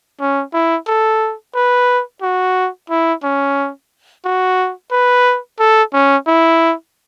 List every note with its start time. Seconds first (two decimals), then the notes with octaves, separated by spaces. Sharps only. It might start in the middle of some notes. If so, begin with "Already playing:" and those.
0.20 C#4
0.53 E4
0.87 A4
1.55 B4
2.22 F#4
2.90 E4
3.23 C#4
4.25 F#4
4.92 B4
5.59 A4
5.93 C#4
6.27 E4